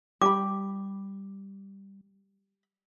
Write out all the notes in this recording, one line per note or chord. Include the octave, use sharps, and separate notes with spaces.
G3 G4 B5 D6